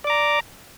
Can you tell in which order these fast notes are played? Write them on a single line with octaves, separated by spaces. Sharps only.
D5 D6 A#5